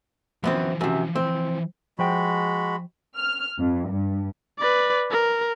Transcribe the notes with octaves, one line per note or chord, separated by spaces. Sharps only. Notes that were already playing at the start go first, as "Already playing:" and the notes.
F#2 E3 F3 B3 C4
F#2 C3
C4
F3 G#3 F#4 C5 G5 B5
F6
F2
G2
B4 D5
A#4